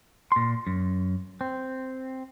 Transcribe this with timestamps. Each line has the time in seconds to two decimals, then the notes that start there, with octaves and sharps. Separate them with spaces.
0.32 A#2 C6
0.67 F#2
1.41 C4